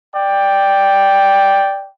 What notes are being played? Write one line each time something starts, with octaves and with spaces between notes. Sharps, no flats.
D5 G5